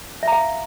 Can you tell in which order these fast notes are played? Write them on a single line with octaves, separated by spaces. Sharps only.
E5 A#5 F5